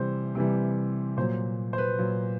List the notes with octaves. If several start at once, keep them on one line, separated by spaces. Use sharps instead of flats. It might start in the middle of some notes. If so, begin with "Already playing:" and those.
Already playing: C3 E3 G3 C5
C3 E3 G3
A#2 F#3 C5
C5
B4
A#2 F#3